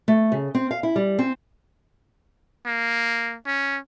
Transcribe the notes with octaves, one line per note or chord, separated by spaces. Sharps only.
A3
C#3
C4
F5
E4
G3
C4
A#3
C#4